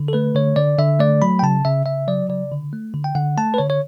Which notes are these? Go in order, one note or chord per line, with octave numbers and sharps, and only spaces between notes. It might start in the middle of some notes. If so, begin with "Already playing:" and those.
Already playing: D3
A4
A3 B4
D3 C#5
D3 D5
D3 E5
A3 D5
F#3 B5
G5
C#3 A5
C#3 E5
C#3 E5
F#3 D5
C#3 D5
D3
A3
D3
G5
D3 F#5
A3 A5
B4
D3 C#5
C#5